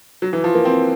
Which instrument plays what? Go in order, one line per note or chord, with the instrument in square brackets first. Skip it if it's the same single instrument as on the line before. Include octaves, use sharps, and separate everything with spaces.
[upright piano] F#3
E3
F3
A#3
C4